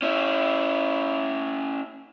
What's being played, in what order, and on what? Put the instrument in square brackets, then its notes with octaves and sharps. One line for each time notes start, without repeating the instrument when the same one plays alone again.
[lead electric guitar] C#4 E4